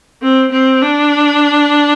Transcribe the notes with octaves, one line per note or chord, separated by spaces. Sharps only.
C4
C4
D4